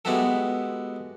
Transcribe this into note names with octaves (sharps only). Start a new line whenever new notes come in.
G#3 B3 E4 F#4 G4 A4